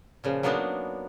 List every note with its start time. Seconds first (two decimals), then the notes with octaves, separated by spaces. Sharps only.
0.24 A#2 C#3 F3
0.43 F#3 A#3 B3 D4 D#4